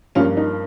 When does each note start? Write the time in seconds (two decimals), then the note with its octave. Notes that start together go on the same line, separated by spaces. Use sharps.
0.15 G2 F3 A#3 C#4 F4
0.37 D#4